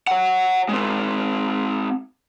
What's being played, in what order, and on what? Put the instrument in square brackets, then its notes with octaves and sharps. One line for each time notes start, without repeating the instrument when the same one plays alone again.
[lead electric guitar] C#5 F#5
G#3 C4